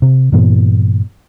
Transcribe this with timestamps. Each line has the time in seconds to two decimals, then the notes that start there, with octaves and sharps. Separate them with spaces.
0.02 C3
0.32 G2 A#2 E3 B3